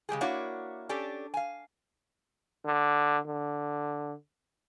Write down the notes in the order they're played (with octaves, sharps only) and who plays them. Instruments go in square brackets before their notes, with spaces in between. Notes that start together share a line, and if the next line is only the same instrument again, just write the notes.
[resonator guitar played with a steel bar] C#3 G#3 G4 G#4
A#3 D4 E4 F#4 C#5
C#4 D4 G4 A4
F5 G#5
[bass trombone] D3
D3